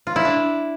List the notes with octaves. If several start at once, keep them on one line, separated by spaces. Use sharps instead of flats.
F4
E4
D4